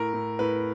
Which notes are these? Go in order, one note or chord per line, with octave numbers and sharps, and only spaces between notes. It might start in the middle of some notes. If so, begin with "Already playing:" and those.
Already playing: A2 A#4
A2
A2 B4